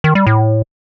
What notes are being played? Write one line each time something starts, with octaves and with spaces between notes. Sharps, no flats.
D#3
G3
A2